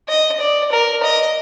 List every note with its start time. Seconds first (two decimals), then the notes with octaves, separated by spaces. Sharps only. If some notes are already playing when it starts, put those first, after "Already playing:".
0.09 D#5
0.40 D5
0.72 A#4
1.03 D#5